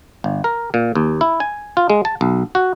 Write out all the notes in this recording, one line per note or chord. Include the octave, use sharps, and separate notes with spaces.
G1
A#4
A#2
D#2
E4
G#5
F4
G#3
A5
B1
F#4